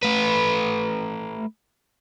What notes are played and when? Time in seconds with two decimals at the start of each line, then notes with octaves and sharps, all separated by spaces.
0.03 A3 B4